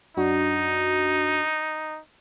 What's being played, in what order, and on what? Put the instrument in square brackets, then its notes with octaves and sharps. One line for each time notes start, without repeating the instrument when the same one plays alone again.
[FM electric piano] F#2 D4 F#4 [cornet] D#4